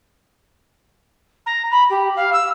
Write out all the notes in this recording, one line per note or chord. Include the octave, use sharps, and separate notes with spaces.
A#5
B5
G4
F5
E6